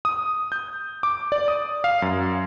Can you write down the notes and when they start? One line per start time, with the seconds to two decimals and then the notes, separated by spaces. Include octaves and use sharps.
0.05 D#6
0.52 G6
1.03 D6
1.32 D5
1.48 D#6
1.84 F5
2.02 F#2